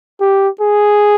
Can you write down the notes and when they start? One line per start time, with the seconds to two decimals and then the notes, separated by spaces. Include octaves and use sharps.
0.21 G4
0.61 G#4